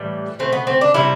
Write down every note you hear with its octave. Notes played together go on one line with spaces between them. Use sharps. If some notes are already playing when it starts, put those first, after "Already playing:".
Already playing: A2 E3 G3
B2 A3 C4
B3
C4
D4
C3 G3 E4